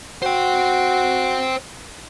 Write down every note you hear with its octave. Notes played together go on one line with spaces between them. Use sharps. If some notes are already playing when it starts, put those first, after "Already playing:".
F#4 C5 G5